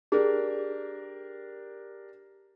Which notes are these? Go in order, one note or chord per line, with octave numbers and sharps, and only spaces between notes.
D4 G4 G#4 A#4